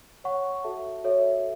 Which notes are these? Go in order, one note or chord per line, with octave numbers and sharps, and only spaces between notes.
C#5 F#5 C#6
F#4 A4 E5 A5
F#4 A4 C#5 E5